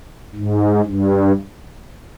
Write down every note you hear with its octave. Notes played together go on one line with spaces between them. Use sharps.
G#2
G2